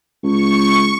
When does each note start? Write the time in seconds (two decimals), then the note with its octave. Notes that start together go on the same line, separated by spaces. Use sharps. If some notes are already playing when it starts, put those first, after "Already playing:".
0.23 C#2 C#6